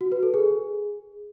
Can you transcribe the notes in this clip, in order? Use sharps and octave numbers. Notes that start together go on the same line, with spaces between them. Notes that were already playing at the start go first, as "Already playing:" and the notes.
F#4
B4
A4
G#4